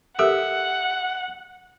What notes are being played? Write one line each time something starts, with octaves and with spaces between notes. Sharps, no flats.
G4 A4 A#4 E5 F#5